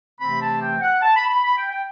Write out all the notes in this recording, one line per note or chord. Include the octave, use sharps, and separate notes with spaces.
C3 E3 A3 C4 B5
A5
G5
F#5
A5
B5
B5
B5
G5
G5